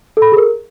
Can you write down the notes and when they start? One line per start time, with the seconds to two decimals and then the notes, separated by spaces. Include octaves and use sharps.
0.17 A4
0.22 B5
0.27 A4
0.32 G#4
0.37 A#4